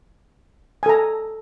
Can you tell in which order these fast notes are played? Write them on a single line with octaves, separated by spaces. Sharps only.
G#5 A4 A#5